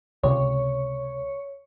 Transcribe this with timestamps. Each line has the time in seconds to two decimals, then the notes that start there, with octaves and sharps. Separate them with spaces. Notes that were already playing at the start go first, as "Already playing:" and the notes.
0.24 C#2 C3 C#5